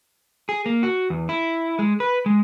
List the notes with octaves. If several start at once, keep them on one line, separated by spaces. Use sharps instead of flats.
G#4
A#3
F#4
E2
E4
G#3
B4
G#3